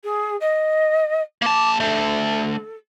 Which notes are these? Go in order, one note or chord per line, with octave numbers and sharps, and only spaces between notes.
G#4
D#5
A#3 A5 D6
A3 D4 A4